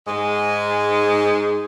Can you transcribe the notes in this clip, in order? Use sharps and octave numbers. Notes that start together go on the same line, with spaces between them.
G#2 G#3